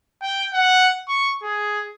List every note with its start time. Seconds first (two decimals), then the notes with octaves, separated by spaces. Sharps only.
0.22 G5
0.54 F#5
1.09 C#6
1.43 G#4